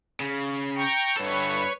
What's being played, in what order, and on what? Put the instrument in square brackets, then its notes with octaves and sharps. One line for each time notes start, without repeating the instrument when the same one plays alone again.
[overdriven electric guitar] C#3
[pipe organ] G5 A#5 C#6
[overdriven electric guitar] G2 A4 [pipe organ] B4 C#5